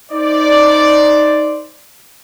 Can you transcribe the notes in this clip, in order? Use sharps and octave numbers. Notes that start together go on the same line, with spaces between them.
D#4 C5 D5